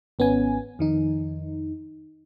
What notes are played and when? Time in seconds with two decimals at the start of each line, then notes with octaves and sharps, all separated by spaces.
0.19 G#1 B3 C#4 G#5
0.79 F2 D#3 D#4